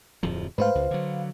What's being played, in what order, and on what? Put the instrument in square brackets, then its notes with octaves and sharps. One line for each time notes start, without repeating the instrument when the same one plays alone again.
[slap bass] D1 F2 F3
[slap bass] G#2 A3 [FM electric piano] B4 C5 F5
[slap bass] C#2
D3 F#3